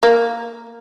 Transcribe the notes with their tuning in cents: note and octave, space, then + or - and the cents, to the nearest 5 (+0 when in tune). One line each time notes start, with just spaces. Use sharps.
A#3 +0